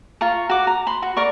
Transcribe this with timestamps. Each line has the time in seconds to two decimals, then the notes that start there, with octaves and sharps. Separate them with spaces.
0.21 F4 A#5 C#6
0.49 F#4 D6
0.67 A#5
0.87 B5 C6
1.02 F#4
1.17 A#4 D5 C#6